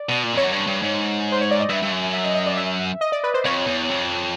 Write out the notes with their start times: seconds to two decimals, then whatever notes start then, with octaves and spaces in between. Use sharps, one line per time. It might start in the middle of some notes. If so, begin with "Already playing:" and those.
Already playing: D5
0.09 B2
0.23 A#2
0.34 F2 C#5
0.43 F#2
0.52 G2
0.67 G2
0.82 G#2
1.32 C5
1.41 C#5
1.51 D5
1.60 D#5
1.69 G2 E5
1.82 G2
1.91 F#2
2.13 E5
2.24 D#5
2.35 D#5
2.46 D5
2.57 E5
3.01 D#5
3.12 D5
3.24 B4
3.34 C5
3.45 F2 C#5
3.67 E2
3.89 F2